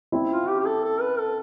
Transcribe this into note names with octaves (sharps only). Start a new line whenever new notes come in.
C4 E4
F4
G4
G4
A4
A4
B4
A4